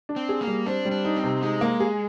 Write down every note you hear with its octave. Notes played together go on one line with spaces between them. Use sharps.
D4
C4
G#4
A#3
G3
C4 D4
G3
D4
D#4
C4
C3
G#3 D#4
A#3
G#4